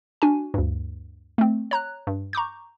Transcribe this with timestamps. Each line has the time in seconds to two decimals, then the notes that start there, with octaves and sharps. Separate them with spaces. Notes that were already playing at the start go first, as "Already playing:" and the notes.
0.22 D4 F#4 G#5
0.54 D2 G2
1.38 A3 C4
1.71 C#5 A#5 F#6
2.07 G2
2.33 A#5 C#6 D6 G6